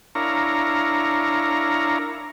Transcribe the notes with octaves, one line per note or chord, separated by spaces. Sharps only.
D4 E4 A#4 C#5 F5 A#5